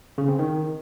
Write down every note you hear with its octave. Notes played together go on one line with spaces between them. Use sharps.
C#3
C4
D#3